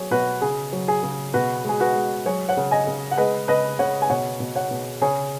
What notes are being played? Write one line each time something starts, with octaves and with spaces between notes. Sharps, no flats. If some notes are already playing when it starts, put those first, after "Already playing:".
Already playing: F#3 G#4 C#5
B2 F#4 B4
C#3 G#4
F#3
G#4
C#3
B2 F#4 B4
G#3 G#4
F#4 B4
G#3
F#3 G#4 C#5
C#5 F#5
C#3
D#5 G#5
C#3
F#5
G#3 B4 D#5
C#3 B4 D#5
C#3 C#5 F#5
G#5
B2 C#5 F#5
B2
C#5 F#5
B2
C#3 G#4 C#5